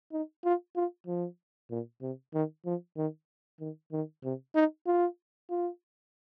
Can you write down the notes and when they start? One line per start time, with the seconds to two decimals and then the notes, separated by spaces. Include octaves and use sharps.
0.12 D#4
0.45 F4
0.76 F4
1.07 F3
1.71 A#2
2.02 C3
2.34 D#3
2.66 F3
2.97 D#3
3.60 D#3
3.92 D#3
4.24 C3
4.55 D#4
4.87 F4
5.50 F4